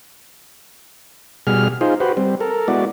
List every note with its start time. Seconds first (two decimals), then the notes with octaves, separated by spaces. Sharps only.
1.47 B2 G3 G#4 F6
1.81 D#4 F4 G#4 C5
2.00 F#4 G4 B4 C5
2.17 G3 C4
2.40 A4 A#4
2.68 G#3 B3 E4 F#4 D5